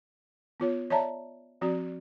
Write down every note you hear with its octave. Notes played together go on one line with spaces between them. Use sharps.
B3 F4 C#5
C#5 D5 E5 A5 A#5
F3 C4 F#4 D5